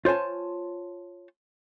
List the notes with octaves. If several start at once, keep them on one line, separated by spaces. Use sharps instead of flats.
F4 C5 C#5 G#5 A5